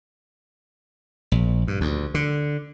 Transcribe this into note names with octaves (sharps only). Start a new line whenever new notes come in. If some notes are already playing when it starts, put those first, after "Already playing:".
A#1
G2
D2
D3